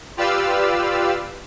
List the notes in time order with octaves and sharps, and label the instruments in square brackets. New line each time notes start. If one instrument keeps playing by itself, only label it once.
[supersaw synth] F4 G4 B4 D5 F5 E6